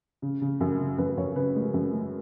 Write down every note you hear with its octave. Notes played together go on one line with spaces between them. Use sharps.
C#3
C#3
F#2
C#3
F#2 B4
F#2 C#5
C#3 B4
G#3
F#2
G#3